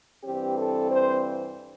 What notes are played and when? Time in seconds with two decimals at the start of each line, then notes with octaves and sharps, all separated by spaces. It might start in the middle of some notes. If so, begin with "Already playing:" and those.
0.23 G2 E3 C4 G4
0.57 A4
0.90 C5